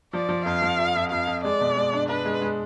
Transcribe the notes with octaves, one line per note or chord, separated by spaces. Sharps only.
F3 D5
F3
F2 F5
F3
F2
F2
F2 F5
F2
G#3 D5
B2
G#3
D4
D4 B4
G#3
G#3